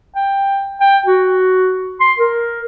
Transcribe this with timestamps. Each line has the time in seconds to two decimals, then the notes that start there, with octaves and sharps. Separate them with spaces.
0.16 G5
0.81 G5
1.06 F#4
2.00 C6
2.18 A#4